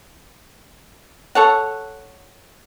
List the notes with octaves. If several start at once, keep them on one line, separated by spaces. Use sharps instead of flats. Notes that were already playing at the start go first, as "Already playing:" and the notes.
A4 C#5 F#5